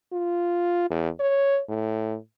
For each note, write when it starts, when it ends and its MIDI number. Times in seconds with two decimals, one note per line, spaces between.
0.13 0.85 65
0.90 1.09 40
1.20 1.60 73
1.69 2.16 45